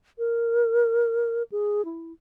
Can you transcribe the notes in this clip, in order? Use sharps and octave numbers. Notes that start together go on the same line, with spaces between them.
A#4
G#4
E4